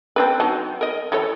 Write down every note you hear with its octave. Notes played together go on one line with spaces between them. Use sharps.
C4 D4 B4
F#3 D#4 A5
A#4 D#5
E3 A4 C#5